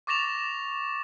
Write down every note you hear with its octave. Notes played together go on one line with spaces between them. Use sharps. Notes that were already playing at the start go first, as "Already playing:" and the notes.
C#6 D6 A6 A#6 E7 F7